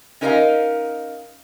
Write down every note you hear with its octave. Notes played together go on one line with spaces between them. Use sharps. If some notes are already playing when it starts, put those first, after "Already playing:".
C#4 D#4 A#4 B4 D#5 F5